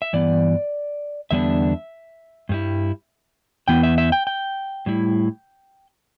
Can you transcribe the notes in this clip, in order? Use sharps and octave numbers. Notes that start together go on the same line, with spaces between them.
E5
G2 E3 B3 D5
E2 D3 G3 B3 D4 E5
G2 G3 E4
E2 E3 B3 G5
E5
E5
G5
G5
A2 G3 E4